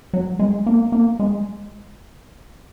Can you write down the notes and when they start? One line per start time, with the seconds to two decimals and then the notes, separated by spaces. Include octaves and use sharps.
0.13 F#3
0.39 G#3
0.66 A#3
0.92 A#3
1.20 G#3